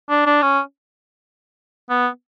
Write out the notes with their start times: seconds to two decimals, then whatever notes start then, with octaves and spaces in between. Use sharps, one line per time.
0.09 D4
0.26 D4
0.42 C#4
1.90 B3